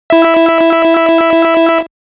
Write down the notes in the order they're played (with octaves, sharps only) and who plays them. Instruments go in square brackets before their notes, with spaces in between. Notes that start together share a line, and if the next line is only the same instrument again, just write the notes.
[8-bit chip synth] E4 E5